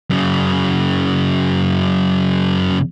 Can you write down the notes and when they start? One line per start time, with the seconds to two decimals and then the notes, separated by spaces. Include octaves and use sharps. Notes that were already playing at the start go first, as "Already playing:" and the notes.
0.10 F#2 C#3